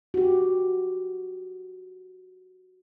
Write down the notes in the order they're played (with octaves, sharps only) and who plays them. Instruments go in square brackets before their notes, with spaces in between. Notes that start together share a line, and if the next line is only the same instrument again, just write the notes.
[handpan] F#4 G4